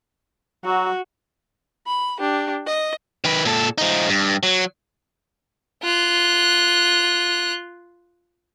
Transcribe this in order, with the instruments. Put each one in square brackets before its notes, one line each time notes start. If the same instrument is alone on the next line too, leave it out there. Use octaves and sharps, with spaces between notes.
[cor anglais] F#3 [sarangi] F#4
[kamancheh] B5
D4 G4
D#5
[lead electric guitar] D#3 B4
A#2 A4
F3 D#4
G2
F#3
[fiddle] F4 F#6